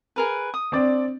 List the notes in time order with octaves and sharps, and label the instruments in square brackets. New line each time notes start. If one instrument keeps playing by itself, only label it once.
[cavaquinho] G#4 A#4 B4
D#6
[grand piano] C4 D4 D5